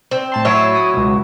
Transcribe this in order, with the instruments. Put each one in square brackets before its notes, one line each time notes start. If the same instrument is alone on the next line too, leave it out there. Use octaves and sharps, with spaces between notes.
[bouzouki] C4
[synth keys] A2 A5 C6
[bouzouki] F#3 E4 C#5
[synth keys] D#6
C#2 B2